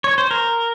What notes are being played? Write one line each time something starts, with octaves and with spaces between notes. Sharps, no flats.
C#5
C5
A#4